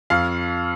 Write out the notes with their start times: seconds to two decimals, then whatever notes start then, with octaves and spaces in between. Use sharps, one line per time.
0.10 F2 F5